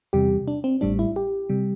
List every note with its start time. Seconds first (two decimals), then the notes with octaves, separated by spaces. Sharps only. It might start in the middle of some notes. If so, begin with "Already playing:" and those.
0.13 E2 C3 G3 G4
0.48 D4
0.64 C4
0.81 A1 A2 G3 D4
0.99 E4
1.16 G4
1.49 C3 G3